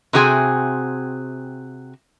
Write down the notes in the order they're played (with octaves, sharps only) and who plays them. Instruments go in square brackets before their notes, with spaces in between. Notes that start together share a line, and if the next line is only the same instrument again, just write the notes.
[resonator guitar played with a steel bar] C3 C4 F#4 G#4 G5 G#5